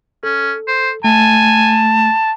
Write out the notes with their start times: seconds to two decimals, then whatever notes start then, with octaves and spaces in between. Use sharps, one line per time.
0.23 C#4 A4
0.68 C5
1.04 A3 G#5 A5